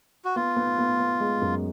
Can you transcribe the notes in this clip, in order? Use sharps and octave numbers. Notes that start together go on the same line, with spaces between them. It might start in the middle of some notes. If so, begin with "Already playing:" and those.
F#4
B3 F4
B3
B3
B3
G#3
F#2